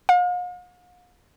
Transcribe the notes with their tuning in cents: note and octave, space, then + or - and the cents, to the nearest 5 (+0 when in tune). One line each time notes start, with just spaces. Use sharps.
F5 +45